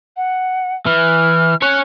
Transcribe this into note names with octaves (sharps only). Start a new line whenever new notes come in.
F#5
E3 F6
C#4 C#5 F#6